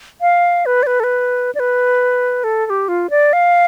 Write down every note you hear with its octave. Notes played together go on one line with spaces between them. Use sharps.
F5
B4
D5
B4
A4
B4
D5
B4
A4
A4
G4
F4
D5
F5